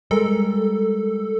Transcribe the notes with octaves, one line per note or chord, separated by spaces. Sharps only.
G3 G#3 A4 A#4